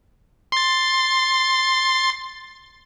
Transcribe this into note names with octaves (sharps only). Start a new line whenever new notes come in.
C6 A6